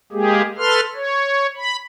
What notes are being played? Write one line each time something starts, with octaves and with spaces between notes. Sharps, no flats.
G#3 A#3 G4 G#4
A4 B4 C6 F6
C#5
B5